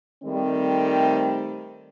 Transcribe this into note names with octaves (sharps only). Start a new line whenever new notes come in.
D#3 G3 A3 C4